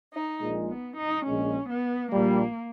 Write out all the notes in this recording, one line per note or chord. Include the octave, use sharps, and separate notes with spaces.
D#4
A#1 A#2 G#3
B3
D#4
A#1 A#2 G#3 C#4
B3
A#1 A#2 G3 A#3